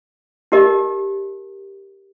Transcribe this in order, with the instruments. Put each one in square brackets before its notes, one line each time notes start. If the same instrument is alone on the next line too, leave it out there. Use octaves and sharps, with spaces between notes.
[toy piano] D#4 G4 A#4 D#5